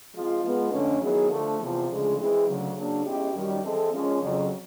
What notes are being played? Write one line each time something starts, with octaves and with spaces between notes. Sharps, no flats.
F3 G#3 C4 F4
F3 G#3 B3
F2 D3 F3 A3 C#4
D#3 F#3 B3 E4 G#4
D3 F3 A3
E2 C3 F3
D2 C#3 F3 G#3
E3 G#3 C4 E4 G#4
D2 C#3 F#3
C#3 F#3 A#3 D4
B2 G#3 C#4 E4 G4
F#2 D#3 G3
E3 G#3 C4 E4 A4
A#2 F3 G#3 C#4
F2 C#3 F#3